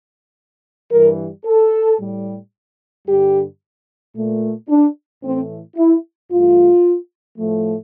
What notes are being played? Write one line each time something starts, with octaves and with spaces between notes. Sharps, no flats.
G2 E3 G3 A#4
A4
A2 G3
G2 D3 G3 G4
A#2 A3
D4
A2 E3 A3 C4
E4
G2 E3 A3 F4
A2 F3 A3